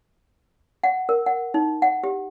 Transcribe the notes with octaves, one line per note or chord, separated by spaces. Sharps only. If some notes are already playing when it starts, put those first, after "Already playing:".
F#5
A#4
F#5
D#4
F#5
G4